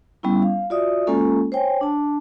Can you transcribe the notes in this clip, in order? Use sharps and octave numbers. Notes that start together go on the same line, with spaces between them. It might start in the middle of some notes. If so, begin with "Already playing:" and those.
G3 B3 C#4 E4
F5
F4 F#4 D5 E5 D#6
G#3 A#3 C#4 F4 A4
C5 C#5 G5 G#5
D4 A5